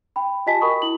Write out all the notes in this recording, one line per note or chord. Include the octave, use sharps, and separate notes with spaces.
G5 B5
F4 G4 D#5 G#5 A5 B6
F#4 A#4 G5 B5 C#6 D#6
E4 F#7